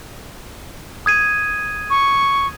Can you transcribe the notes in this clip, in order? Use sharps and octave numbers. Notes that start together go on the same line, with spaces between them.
D#6 G#6 D#7
C#6